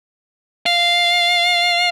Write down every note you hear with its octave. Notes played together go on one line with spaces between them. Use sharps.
F5